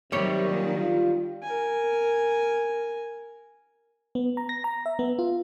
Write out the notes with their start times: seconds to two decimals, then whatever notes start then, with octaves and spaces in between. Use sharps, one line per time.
0.12 C3 D#3 F#3 G3 G4 C#5
0.49 A#2
0.77 F4
1.43 A#4 G#5
4.15 B3
4.37 A#5
4.49 A#6
4.64 A#5
4.86 E5
4.99 B3
5.19 F4